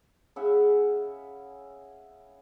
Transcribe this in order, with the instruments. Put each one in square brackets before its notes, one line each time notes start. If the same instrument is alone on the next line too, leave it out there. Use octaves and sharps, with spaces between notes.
[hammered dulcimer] C#3 E4 E5 F#5